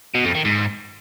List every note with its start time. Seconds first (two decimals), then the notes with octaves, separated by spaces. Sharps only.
0.15 B2
0.25 F2
0.35 D#3
0.45 G#2